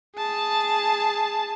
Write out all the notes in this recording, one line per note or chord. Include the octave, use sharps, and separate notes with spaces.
G#4 A5